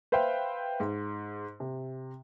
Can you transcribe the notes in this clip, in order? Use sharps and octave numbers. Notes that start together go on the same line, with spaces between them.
B4 C5 E5 F5 G5
G#2
C3